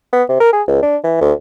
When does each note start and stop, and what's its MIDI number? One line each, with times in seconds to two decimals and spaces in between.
0.13 0.23 59
0.29 0.38 48
0.40 0.53 70
0.53 0.62 68
0.68 0.83 37
0.83 0.97 62
1.04 1.17 52
1.21 1.33 38